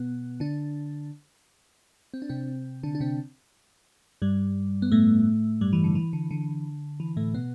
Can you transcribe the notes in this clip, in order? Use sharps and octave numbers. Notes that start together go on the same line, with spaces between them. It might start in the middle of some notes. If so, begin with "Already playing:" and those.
Already playing: B2 B3
D3 D4
C4
D4
C3 C4
D3 D4
D4
C3 C4
G2 G3
B3
A2 A3
G2 G3
E3
D3
E3
D3
D3
E3
A2 A3
B2 B3